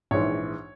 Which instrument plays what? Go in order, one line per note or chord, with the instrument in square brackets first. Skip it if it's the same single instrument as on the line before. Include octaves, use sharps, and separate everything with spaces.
[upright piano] A#1 G#2 E3 C#5